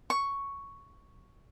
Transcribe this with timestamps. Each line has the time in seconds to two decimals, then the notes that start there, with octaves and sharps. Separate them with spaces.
0.10 C#6